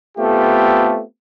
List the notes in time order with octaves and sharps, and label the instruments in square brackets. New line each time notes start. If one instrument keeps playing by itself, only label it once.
[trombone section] A3 B3 C4 F4 G4 A4